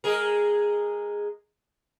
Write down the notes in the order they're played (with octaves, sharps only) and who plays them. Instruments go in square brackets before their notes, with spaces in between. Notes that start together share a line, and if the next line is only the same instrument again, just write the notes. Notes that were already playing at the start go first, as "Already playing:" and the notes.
[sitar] G#3 G#4 A#4